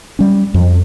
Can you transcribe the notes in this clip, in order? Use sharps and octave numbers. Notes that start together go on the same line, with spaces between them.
G3 C#4
F2 F3